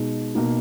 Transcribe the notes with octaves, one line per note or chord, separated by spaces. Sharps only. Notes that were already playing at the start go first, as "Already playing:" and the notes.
Already playing: B2 G#3 D#4
B2 A#3 D#4